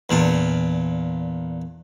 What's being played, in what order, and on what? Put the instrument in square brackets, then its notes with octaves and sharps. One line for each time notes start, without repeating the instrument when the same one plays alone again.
[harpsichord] E2 A#2 D4